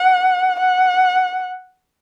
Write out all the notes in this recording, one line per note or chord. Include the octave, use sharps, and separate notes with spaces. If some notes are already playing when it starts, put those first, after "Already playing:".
Already playing: F#5
F#5